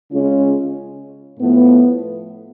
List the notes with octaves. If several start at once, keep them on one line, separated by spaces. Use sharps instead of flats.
C#3 G#3 C#4 F4
A2 F3 B3